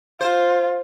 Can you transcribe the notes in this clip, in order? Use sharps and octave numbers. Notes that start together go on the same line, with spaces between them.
F4 C5